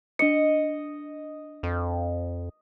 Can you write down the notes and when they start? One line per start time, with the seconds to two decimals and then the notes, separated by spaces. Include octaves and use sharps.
0.19 D4 D#5 C#7
1.63 F2